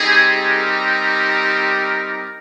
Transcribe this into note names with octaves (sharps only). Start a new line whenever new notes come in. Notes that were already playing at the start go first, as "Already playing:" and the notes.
Already playing: G3 C4 D#4 G4 G#4
A#4